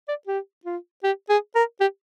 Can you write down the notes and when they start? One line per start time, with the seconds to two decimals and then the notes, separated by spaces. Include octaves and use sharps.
0.08 D5
0.27 G4
0.65 F4
1.04 G4
1.30 G#4
1.55 A#4
1.80 G4